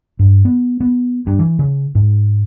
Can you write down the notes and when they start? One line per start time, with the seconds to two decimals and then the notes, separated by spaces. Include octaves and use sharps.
0.19 G2
0.45 B3
0.80 B3
1.27 G2
1.39 E3
1.59 C#3
1.95 G#2